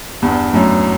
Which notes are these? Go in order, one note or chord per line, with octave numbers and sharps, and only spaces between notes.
E2 G2
F#2 A2